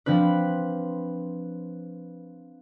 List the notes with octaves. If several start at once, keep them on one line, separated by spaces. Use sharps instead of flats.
F3 C4 D4 B4